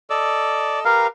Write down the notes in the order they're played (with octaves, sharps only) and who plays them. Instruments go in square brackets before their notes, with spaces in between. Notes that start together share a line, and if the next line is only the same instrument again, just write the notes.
[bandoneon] A4 D#5 E6 [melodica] D5
[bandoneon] G4 B4 [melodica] A#4 F5